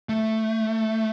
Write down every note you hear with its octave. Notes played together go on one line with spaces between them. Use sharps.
A3